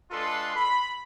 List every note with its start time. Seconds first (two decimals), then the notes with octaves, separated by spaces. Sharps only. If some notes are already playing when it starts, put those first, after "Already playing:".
0.11 G#3 D4 F4 A4 B4 C6
0.55 B5